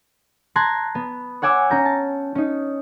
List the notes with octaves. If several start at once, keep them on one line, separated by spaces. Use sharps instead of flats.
A5 A#5 C6 F#6 G#6 A6
B3
C#5 F#5 G#5 D6 E6
C#4 A#5 G6
A5
C#4 D#4